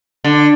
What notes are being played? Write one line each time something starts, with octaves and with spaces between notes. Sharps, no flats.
D3